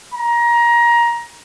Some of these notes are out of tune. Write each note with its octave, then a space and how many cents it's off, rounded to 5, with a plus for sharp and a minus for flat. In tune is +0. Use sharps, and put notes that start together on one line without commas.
A#5 +20